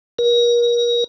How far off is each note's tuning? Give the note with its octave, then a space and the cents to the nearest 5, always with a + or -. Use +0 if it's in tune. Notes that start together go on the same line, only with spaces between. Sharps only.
A#4 +35